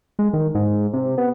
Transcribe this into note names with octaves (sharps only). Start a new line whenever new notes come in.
G#3
D#3
G#2
C3
B3